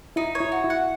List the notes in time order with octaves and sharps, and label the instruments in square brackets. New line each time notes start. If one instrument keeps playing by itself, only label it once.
[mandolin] D#4 [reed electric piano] E4
[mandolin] C#5
[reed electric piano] E4
[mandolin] F#4
[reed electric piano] E4
[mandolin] F#5